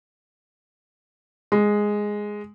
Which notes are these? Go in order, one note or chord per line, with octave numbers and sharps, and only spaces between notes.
G#3